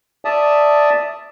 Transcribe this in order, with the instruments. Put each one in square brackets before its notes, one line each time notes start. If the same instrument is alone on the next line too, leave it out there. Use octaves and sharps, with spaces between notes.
[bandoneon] D5 E5 A5 D#6